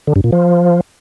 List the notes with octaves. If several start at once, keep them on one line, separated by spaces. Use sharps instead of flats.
D3
G2
A#2
F3